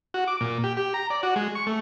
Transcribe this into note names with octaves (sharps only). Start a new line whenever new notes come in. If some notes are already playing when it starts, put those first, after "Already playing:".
F#4
D6
A#2
G4
G4
A#5
D5
F#4
G#3
C#6
A3